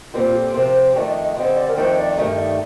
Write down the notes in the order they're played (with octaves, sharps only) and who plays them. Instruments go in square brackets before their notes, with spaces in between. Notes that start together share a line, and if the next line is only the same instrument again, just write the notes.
[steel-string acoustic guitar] A#2 G3 C4 [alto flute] F4
[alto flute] A4
[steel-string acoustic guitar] C3 F3 C4 [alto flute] A#4
[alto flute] C5
[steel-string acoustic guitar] F2 D#3 A3 D4 [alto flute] D5
[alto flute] D#5
D#5
[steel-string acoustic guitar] D3 G3 C4 [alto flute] D#5
[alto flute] D5
A#4
[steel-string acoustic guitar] F2 D#3 A3 D4 A4 [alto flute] C5
[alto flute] D5
[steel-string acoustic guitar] G2 D#3 A3 D#4 [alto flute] D#5
[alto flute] D5